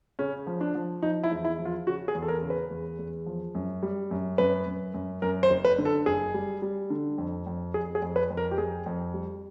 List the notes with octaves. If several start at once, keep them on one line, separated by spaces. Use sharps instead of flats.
C#3 C#4
F3
D4
F3
F3 D#4
E4
E2
E4
F3
F4
C#3 F#4
G#4
E2
A4
A#4
C#3
B4
E2
E2
F3
F#2
G3
F#2
F#2 B4
F#2
F#2
F#2 A#4
C5
F#1
B4
D3
A4
F#1 G#4
G3
G3
D3
F2
F2
F2 G#4
G#4
F2
B4
F2
A#4
G4
F2 G#4
F2
G3